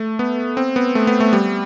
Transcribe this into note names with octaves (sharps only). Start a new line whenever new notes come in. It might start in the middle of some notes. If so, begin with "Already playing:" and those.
Already playing: A3
B3
C4
B3
A3
B3
A3
G3